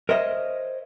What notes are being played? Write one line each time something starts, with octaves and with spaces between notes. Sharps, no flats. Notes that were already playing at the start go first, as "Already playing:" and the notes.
A#4 C5 C#5 D#5 E5